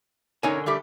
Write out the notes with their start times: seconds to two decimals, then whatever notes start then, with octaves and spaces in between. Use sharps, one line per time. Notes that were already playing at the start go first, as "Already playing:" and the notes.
0.43 D3 C#4 D#4 A#4 C#5 G#5
0.66 G3 A3 G4